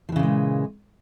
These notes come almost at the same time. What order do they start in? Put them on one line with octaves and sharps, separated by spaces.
F3 E3 C#3 A#2 G#3